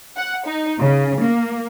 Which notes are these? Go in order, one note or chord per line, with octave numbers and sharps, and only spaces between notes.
F#5
D#4
C#3
A#3